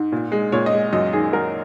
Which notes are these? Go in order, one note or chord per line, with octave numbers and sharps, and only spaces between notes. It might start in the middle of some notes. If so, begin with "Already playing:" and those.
Already playing: G#2
A#2
G#3
A#2 C#5
D#5
G#3
F#2 D#5
D#3 G#4
F#3 A#4